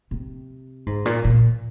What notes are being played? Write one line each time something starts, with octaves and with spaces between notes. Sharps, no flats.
C3
G#2
A#2
A#2